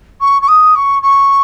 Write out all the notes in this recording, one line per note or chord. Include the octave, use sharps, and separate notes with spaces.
C#6
C#6
D#6
C#6
C#6